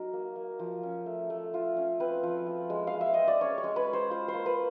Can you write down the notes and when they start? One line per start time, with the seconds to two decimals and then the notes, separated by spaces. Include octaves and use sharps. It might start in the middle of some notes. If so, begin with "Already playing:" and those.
Already playing: F#3 D#4 A#4
0.13 A#3
0.36 A#3
0.59 F3
0.83 C#4
1.06 A3
1.30 A3
1.54 F4
1.77 C#4
2.00 C4 B4
2.23 F3
2.46 F3
2.70 G#3
2.87 F5
2.94 G#3
3.01 E5
3.14 C4 D#5
3.28 D5
3.41 C#4 C#5
3.58 C#5
3.64 G#3
3.76 B4
3.88 G#3
3.93 C5
4.10 F4 C5
4.28 C5
4.34 A#3
4.46 B4